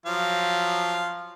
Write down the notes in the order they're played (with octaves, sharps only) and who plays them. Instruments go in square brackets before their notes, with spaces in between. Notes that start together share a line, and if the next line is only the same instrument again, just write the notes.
[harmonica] F3 F#3 F5